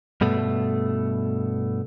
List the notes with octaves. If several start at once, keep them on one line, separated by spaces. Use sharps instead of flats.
G2 B2 A3